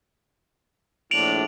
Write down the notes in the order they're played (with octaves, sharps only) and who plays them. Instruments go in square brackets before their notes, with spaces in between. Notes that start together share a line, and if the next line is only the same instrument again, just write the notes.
[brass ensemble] A#1 A2 D4 [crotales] D7 F7 F#7